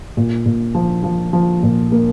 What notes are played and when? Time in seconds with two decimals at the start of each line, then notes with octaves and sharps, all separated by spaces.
0.17 A#2
0.46 A#2
0.75 F3
1.04 F3
1.33 F3
1.63 A#2
1.92 A#3